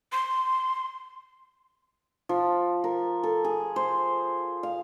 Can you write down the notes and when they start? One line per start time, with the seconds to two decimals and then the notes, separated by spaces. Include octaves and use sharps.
0.12 C6
2.29 F3
2.84 A#4
3.23 A4
3.44 G#4
3.76 C5
4.63 F5